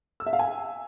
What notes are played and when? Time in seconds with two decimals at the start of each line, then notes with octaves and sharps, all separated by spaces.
0.20 E6
0.26 E5
0.33 F5
0.39 G#5